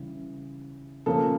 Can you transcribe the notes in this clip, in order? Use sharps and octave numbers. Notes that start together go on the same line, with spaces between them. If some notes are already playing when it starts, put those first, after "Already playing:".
Already playing: C#3 E3 G3
C#3 F3 A#3 A4